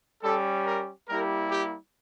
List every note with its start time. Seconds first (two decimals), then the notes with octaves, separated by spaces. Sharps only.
0.23 G3 C#4 G4 A4
0.66 A#4
1.09 G3 A#3 E4 G4 A#4
1.51 G4